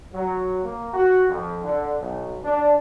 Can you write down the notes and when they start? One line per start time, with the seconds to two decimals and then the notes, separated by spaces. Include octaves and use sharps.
0.13 F#3
0.63 A#3
0.94 F#4
1.29 F2
1.64 D3
1.99 B1
2.44 D4